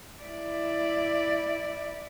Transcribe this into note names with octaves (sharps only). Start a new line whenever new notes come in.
E4 D5